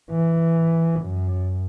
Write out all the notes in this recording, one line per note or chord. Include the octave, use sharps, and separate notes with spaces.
E3
F#2